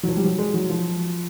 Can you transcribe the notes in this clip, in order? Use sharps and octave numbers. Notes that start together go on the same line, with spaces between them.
F#3
F3
G3
F#3
G#3
F#3
F3